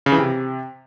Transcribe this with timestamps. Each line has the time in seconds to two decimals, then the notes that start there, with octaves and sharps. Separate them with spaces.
0.06 C#3
0.12 E3
0.18 C3